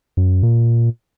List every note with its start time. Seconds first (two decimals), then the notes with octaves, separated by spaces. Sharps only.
0.17 F#2
0.43 A#2